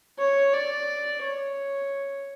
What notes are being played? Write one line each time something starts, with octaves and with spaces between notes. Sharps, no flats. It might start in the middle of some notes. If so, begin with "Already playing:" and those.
C#5
D5
C#5